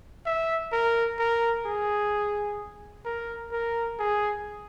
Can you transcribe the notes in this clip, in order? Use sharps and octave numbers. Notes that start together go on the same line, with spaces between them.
E5
A#4
A#4
G#4
A#4
A#4
G#4